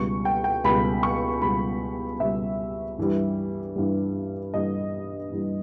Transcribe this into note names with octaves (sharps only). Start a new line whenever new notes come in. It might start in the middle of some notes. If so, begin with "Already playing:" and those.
Already playing: C#2 B2 G3 C#6
G5
G5
C#2 B2 G3 B5
C#6
C#2 B2 G3 B5
C#2 B2 G3 E5
G2 E3 G3
G2 E3 G3
G2 E3 G3 D#5
G2 E3 G3